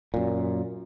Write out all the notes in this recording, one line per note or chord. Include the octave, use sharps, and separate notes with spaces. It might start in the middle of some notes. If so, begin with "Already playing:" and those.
F#2 A#2